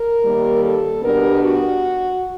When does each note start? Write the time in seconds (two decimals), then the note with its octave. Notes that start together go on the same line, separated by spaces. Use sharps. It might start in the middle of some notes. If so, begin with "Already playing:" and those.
Already playing: A#4
0.22 D#2 D#3 G3 A#3
0.62 A4
1.02 B2 G3 B3 D4 A#4
1.43 F#4